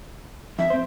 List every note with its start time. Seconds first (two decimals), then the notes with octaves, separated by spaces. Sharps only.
0.59 F2 E5
0.70 C4 C5